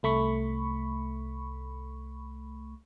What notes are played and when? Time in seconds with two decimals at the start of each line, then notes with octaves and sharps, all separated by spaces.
0.03 C2 A3 B5 C#6